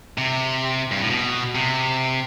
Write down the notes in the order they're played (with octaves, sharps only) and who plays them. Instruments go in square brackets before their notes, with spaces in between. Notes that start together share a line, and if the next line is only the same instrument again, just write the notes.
[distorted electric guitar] C3
G2
A2
B2
C3